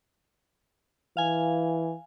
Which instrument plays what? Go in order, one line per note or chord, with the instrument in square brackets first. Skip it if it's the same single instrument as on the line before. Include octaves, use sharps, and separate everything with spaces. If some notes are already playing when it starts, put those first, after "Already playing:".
[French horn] E3 [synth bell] F5 G#5